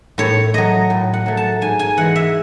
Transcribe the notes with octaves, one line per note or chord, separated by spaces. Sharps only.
A2 C#5
F#3 A3 D#5
A2
F#5
F#3 A3
A5
G#2 G#5
G#5
E3 G#3 F#5
E5